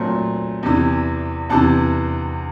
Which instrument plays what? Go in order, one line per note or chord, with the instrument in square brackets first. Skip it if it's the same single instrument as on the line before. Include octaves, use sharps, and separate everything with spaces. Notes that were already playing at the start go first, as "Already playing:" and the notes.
Already playing: [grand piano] A#2 F#3 A3 C4
E2 C3 E3
E2 C3 E3 A5